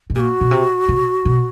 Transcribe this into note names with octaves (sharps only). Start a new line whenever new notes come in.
B2
A#2 F#4 G4
B2
C3
C3
B2